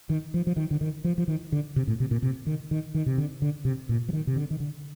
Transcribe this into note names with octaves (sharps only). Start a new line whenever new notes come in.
D#3
F3
F3
D#3
D3
D#3
F3
F3
D#3
D3
C3
A2
C3
A#2
C3
D#3
D#3
D#3
C3
D3
D3
C3
A#2
F3
D#3
C3
D3
D#3
D3